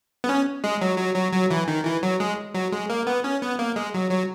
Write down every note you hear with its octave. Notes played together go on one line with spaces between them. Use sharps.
B3
C#4
G#3
F#3
F#3
F#3
F#3
E3
D#3
E3
F#3
G#3
F#3
G#3
A#3
B3
C#4
B3
A#3
G#3
F#3
F#3